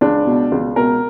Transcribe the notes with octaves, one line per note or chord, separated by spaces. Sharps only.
C#2 D4
B2
C#2
B2 A#4